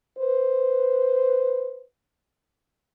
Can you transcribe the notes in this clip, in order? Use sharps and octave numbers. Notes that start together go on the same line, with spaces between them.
B4 C5